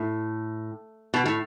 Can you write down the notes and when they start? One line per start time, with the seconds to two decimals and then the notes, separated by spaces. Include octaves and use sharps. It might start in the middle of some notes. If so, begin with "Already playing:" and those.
Already playing: A2
1.14 B2
1.25 A2